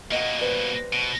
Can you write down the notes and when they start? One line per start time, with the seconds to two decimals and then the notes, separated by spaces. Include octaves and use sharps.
0.11 B2 A#3 D#5 F#5
0.39 G3 B4 C5
0.93 B2